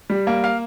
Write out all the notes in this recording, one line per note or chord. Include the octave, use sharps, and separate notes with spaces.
G3
A#3
F5